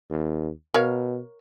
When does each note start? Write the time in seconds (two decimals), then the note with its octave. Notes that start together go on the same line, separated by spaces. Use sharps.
0.10 D#2
0.74 B2 A#4 C#5 F5